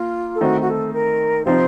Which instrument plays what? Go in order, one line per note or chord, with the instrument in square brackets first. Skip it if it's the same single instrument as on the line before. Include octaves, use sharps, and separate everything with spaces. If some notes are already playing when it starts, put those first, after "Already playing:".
Already playing: [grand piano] A#3 [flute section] F4
[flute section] A4
[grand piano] D#3 A3 C4 D#4 [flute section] F#4
[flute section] F#4
A4
A#4
[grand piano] C3 F3 C4 D#4 [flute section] C5